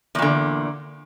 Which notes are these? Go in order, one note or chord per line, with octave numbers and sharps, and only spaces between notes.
E2 A#2 D3